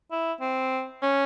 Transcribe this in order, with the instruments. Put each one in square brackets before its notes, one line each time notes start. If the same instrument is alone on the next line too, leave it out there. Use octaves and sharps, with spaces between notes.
[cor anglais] E4
C4
C#4